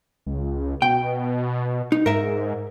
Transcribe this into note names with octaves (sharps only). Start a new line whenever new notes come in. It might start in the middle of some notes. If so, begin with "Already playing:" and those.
C#2
B2 G5
D#4
G#2 A#4 E5